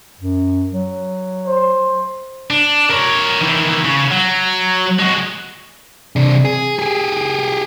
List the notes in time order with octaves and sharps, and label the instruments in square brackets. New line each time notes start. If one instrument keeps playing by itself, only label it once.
[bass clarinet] F#2
F#3
[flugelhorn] C5
[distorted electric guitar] D4
A#4 C#5
D#3 E3
C#3
F#3
G#3 F#4
[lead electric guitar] C3 D4
G#4
G4 G#4